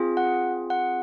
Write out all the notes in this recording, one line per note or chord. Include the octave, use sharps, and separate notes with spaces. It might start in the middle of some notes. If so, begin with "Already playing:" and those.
Already playing: C4 F4 G#4
F#5
F#5